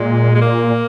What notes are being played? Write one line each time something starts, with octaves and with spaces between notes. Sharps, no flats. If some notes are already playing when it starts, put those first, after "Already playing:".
Already playing: A#2 G#3
G#3
A#3